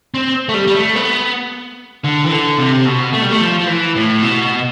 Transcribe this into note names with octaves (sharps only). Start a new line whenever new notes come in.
C4
A3
G3
G3
A3
B3
D3
E3
D3
C3
B2
A3
G3
A3
F3
F3
E3
A2
B2